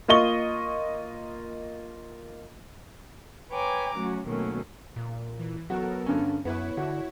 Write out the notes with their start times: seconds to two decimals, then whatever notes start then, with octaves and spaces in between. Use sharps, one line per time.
0.08 A#3 F4 D#5 C#6 G7
3.52 B4 C#5 G5 G#5 A#5 D6
3.95 F#3 A3 C#4 F#4
4.27 B2 D#3 F#3 A3 A#3 C#4
4.96 A#2
5.39 E3
5.70 F#3 B3 F#4 A4 A#4
6.06 G2 D3 C#4
6.45 F#2 B3 E4 B4 C#5
6.77 D3 F#4